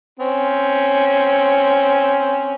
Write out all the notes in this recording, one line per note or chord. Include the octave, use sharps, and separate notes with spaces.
C4 C#4